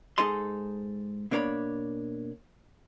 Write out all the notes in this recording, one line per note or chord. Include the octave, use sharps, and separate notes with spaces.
G#2 D#4 G#4 A4 D#5 C6
B2 A#3 D4 C5 C#5 B5